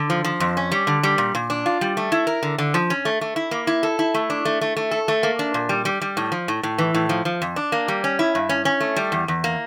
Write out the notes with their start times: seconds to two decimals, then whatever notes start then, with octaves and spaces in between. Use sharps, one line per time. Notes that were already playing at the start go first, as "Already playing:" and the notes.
Already playing: D3
0.10 F3
0.24 F3
0.40 F2
0.57 C#4
0.72 G3
0.87 D3
1.03 G3
1.18 A#2
1.35 A#2
1.50 D4
1.66 F4
1.81 G3
1.97 A3
2.12 E4
2.27 A#4
2.43 D3
2.58 D3
2.74 F3
2.90 C#4
3.05 A3
3.21 A3
3.36 E4
3.51 A#3
3.67 E4
3.83 A4
3.99 E4
4.14 A3
4.30 D4
4.45 A3
4.61 A3
4.77 A3
4.91 A4
5.08 A3
5.23 A#3
5.39 D4
5.54 A#2
5.69 G3
5.85 G3
6.02 G3
6.17 A2
6.32 F3
6.48 A2
6.63 A2
6.78 E3
6.94 A2
7.09 F3
7.25 F3
7.42 F2
7.56 D4
7.72 A#3
7.88 G3
8.04 C#4
8.19 E4
8.35 G2
8.49 C#4
8.65 C#4
8.80 A3
8.96 G3
9.12 E2
9.28 E2
9.44 A#3